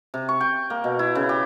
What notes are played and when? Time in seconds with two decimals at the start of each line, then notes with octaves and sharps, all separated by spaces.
0.14 C3
0.29 C#6
0.41 G5
0.70 A#3
0.84 B2
0.99 E4
1.15 C#3
1.29 G4